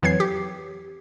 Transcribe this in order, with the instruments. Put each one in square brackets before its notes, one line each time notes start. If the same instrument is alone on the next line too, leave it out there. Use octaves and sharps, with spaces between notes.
[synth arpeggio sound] F2 E3 F#3 G#6 C7
G4